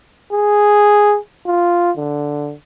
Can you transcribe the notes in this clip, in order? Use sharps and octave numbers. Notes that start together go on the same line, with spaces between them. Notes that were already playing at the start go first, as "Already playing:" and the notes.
G#4
F4
D3